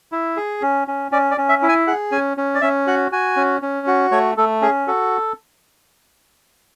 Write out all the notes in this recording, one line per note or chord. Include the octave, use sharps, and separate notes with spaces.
E4
G#4
C#4
C#4
C#4 D5
D5
C#4
E5
E4
G#5
G#4 F#5
C#4 G#5
C#4
D5
C#4 E5
F#4 F#5
F#4 G#5
C#4
C#4
F#4
A3 C#5
A3 A4
C#4 G#4
F#4 A4